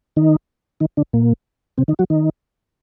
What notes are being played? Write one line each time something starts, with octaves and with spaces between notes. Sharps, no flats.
D#3 D#4
D#3 D#4
D3 D4
A#2 A#3
C3 C4
D#3 D#4
F#3 F#4
D#3 D#4